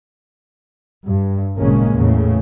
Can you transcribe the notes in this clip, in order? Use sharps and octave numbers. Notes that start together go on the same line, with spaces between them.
G2
G#1 A#2 C#3 G#3 A#3 C#4
E2 A2 C#3